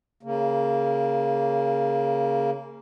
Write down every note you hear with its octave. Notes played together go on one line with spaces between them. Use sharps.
C#3 A#3